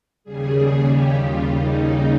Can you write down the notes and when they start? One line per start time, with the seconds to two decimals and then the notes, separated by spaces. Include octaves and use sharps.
0.24 D#2 C#3 G3 G#4
0.56 G#4
0.86 G4
1.18 F4
1.49 D#4